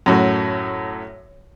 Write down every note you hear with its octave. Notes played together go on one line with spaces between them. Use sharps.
F#2 A2 F#4